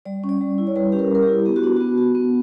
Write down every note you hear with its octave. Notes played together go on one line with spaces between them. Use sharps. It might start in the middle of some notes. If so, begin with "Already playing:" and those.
G3 D5
C#4
D5
G3
E4
C#5
G3 B4
C#4 G4
A#4
G3 A#4
G4
E4
B3 G4
F#4
D4
B3 F#4
F#4
B3